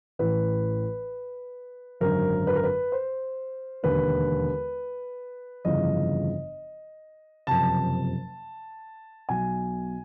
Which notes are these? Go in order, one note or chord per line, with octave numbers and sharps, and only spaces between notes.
A1 A2 E3 B4
G#1 F#2 D3 A#4
B4
A#4
B4
C5
E1 D#2 D3 B4
G1 F2 C#3 E3 D#5
F#1 F2 C3 A5
B1 B2 G#5